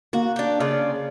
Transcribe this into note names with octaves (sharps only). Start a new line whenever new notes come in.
A#3 F#4
D4 G4
C#3 F4 D5